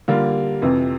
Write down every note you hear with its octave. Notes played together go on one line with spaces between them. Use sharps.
D3 G3 A#3 F4
F2 C3 E3